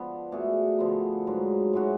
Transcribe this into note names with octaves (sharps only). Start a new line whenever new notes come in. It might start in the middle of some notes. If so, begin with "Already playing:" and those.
Already playing: F3 B3 D4
B2 A3 D4 G#4
D3 F3 B3
G#2 F#3 B3
A2 G#3 C#4 F#4